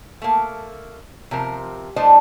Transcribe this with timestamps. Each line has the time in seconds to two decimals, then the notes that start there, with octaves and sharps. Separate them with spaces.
0.22 A3 A#3
1.31 C3 F3 A#4
1.96 E3 G3 A3 D4 C5 D#5